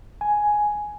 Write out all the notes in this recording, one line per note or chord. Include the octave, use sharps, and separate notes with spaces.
G#5